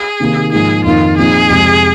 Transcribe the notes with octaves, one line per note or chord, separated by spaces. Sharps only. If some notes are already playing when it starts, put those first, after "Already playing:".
Already playing: G#4
C3 D#3 A#3 D#4
G#2 F3 A#3 D#4 G#4
F2 D#3 A#3 D#4 F4
A#2 F3 C4 D#4 G#4
F2 C3 G#3